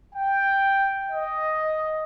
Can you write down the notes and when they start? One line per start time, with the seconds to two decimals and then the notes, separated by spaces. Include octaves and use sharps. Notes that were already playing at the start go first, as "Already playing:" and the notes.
0.15 G5
1.10 D#5